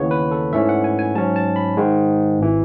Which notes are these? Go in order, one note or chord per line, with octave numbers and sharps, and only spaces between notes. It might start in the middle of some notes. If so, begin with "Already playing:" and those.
Already playing: D#2 C#3 E3 B3 C#5
B4
A4
G#2 E3 A3 C#4 E5
F#5
G#5
G#5
G#2 F#3 C#4 A5
A5
B5
G#2 D#3 G#3
G#1 E3